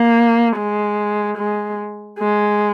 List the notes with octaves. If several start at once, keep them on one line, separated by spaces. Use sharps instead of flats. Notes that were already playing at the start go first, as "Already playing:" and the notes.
Already playing: A#3
G#3
G#3
G#3